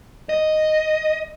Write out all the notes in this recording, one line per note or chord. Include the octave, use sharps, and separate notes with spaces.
D#5